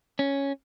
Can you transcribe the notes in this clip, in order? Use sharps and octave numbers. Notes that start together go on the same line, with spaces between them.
C#4